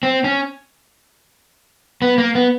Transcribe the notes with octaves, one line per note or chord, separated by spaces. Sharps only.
C4
C#4
B3
A#3
B3